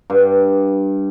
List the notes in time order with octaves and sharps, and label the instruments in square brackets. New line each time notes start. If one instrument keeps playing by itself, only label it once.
[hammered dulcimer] G2